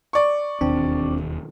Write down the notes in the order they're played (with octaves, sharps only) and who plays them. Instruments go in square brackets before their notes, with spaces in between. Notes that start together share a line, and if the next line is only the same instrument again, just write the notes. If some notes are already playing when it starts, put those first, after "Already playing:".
[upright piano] D5 C#6
[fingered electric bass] E1 D#2 [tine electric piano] C4 D4